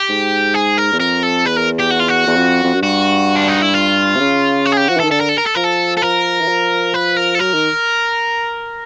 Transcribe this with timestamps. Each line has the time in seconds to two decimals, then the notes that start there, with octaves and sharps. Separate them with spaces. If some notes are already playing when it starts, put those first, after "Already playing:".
Already playing: G4
0.09 G#2
0.54 G#4
0.77 A#4
0.93 E2
0.99 F2 A#4
1.23 A4
1.46 E2 B4
1.57 A#4
1.80 G4
1.91 F#4
2.00 F4
2.09 F#4
2.27 E2
2.36 F2
2.64 F2
2.74 F#2
2.83 G2 F#4
3.36 D4
3.48 D#4
3.62 E4
3.74 F4
4.16 C3
4.20 C#3
4.66 F#4
4.72 G#4
4.77 G4
4.88 F3 F#4
4.97 E3
5.00 A4
5.04 D#3
5.11 D3 A4
5.20 A#4
5.29 A4
5.38 A#4
5.46 A4
5.55 F3 A#4
5.64 A4
5.97 A4
6.02 F3 A#4
6.41 E3
6.48 F3
6.94 B4
7.17 A#4
7.35 A4
7.40 F#3 A#4
7.54 D#3